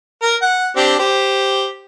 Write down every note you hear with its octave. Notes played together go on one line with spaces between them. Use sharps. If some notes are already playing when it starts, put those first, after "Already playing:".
A#4
F#5
C4 D4 G4
G4 C5